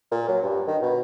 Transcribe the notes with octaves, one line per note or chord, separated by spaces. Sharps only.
A#2
F#3
G2
D#3
B2